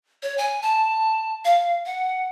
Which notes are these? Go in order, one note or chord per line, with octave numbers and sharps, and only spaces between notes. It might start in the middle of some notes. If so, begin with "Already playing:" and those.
C#5
G#5
A5
F5
F#5